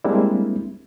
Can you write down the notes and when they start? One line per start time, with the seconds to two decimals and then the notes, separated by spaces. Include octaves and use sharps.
0.04 G3 G#3 A#3 C4 D4 E4